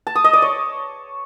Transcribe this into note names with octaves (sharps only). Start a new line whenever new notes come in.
A5
D#6
D#5
D5
C#5